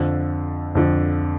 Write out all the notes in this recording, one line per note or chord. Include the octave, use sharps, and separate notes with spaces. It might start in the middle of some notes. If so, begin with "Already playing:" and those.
Already playing: F2 D3 F3
F2 D3 F3